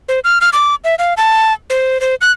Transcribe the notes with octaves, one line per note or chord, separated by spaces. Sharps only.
C5
F6
F6
D6
E5
F5
A5
C5
C5
F#6